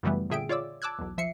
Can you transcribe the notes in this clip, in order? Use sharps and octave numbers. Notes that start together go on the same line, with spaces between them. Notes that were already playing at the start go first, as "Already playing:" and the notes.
F#2 C#3 E3 G3 A3 B3
A#2 D3 G#4 E5 G5 D7
F4 C#5 D5 D6 E6
A5 D6 E6 F#6 G#6
B1 E2
F3 E5 C7 C#7